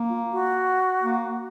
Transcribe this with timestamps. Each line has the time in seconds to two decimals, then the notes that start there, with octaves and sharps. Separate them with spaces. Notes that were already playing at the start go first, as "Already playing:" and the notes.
Already playing: A#3
0.09 F4
0.32 F#4
1.03 A#3